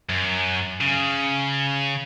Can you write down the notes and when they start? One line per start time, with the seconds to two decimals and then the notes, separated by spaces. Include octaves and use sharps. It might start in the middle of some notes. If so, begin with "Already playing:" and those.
0.09 F#2
0.81 C#3